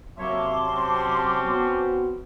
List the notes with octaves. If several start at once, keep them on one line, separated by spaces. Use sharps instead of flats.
C3 F#3 A#3 C#5 E5 A5 C6 D6
C4 C#4
B3 F#4